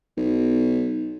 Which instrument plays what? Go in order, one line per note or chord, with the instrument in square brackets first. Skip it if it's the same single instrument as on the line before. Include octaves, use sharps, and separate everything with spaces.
[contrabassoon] B1